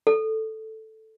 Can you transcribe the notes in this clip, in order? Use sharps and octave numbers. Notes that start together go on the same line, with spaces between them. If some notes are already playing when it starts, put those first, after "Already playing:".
A4